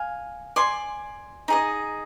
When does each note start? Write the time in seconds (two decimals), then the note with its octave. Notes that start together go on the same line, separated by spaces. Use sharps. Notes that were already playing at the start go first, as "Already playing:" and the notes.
Already playing: F5 G#5
0.56 D5 G#5 C6
1.48 D#4 G#4 D#5